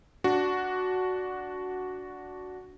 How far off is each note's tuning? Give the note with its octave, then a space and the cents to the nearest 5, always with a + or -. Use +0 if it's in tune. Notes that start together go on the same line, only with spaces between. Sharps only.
D4 -10 F#4 +0